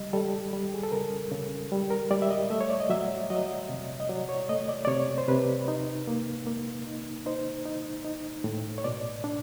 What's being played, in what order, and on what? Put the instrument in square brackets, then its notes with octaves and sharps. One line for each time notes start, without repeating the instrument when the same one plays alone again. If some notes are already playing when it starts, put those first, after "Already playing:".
Already playing: [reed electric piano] C#3 G3 D#5
G3 A4
G3
G#4
A4
C#3 A#4
C#3
G3
A#4
G3 D5
E5
D#5
A3 E5
C#5
D5
D#5
F#3 E5
F#3 D#5
C3
D#5
F#3 D5
C#5
A3 D#5
D5
D5
C3 C#5
C5
C3 B4
D#4
A#3
A#3
D#4
D#4 C5
D#4
D#4
A2
C#5
B2 D5
D4